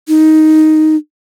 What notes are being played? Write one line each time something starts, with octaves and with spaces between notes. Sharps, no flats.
D#4